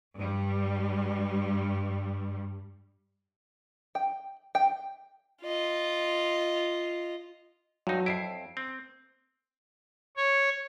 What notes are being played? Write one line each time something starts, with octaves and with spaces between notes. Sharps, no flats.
G2 G3
G5
G5
F4 D#5
G2 F#3 D#4
F2 E4 C7 D7
C4
C#5